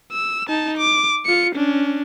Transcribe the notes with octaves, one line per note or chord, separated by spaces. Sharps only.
E6
D#4 A5
D6
F4 C#7
C#4 D4